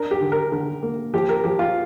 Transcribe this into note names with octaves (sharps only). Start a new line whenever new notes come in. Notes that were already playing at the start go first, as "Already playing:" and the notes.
Already playing: D4 A#4
G4
D3
A#4
D3
A#3
F3 G4
A#4
F3 G4
F4